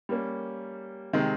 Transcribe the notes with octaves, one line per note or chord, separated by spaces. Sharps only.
G3 A#3 C#4
C3 D#3 G#3 C4